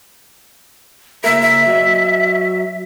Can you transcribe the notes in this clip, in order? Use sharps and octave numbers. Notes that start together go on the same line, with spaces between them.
C#3 A#3 A#4 E5
E5
F#3 F#4 D#5